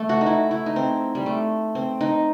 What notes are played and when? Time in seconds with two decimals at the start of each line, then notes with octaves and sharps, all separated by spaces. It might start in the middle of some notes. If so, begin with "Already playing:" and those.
Already playing: A3
0.09 F#4
0.21 D#4
0.26 E4
0.51 E4
0.66 D#4
0.76 C4
1.15 G3
1.26 A3
1.75 C4
2.01 D#4